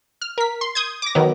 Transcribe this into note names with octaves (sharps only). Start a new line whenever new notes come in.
F6
A#4 B6
C6
D#6 G6 G#6
D6 A#6
D#3 F#3 B3